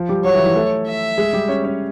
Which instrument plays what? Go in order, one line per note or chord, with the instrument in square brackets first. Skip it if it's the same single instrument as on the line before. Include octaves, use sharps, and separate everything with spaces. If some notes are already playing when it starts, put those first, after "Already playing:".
Already playing: [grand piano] F3 F4
G3 G4
[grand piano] F#3 F#4 [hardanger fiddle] C#5
[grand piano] E3 E4
E3 E4
A3 A4
[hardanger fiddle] E5
[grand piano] G#3 G#4
G3 G4
C#4 C#5
C#4 C#5